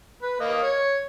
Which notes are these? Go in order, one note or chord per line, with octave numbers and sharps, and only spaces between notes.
B4
A#3 D#5
C#5